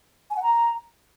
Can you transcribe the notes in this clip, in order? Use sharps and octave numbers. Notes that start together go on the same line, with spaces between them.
G#5
F#5
A#5